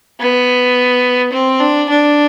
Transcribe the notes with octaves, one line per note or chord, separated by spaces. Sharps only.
B3
C4
D4
D4